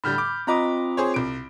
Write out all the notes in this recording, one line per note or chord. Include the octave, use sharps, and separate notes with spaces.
A2 D3 G3 B5 F6 G6
D6
C4 F4 D#5 A#5 B5 D6
G#4 C5 C#5
C2 D7